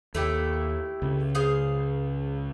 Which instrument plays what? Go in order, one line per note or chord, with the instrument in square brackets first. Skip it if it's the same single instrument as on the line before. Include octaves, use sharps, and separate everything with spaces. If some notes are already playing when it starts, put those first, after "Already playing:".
[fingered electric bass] D#2 [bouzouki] A3 E4 G4
[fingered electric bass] C#2 C#3
[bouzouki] G#4 C5 F5